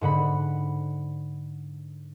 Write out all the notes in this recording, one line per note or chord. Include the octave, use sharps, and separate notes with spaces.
G#2 D3 F#5 B5